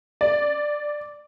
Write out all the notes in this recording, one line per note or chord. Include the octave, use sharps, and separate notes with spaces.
D5